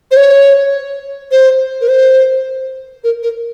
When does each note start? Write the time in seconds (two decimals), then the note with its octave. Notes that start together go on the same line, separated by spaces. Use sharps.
0.11 C5
0.17 C#5
1.32 C5
1.81 A#4
1.89 C5
3.04 A#4
3.23 A#4